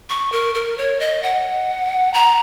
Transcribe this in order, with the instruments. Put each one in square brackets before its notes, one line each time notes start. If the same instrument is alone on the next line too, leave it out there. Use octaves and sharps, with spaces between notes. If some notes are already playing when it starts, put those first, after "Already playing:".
[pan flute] C#6
A#4
A#4
C#5
D#5
F#5
A#5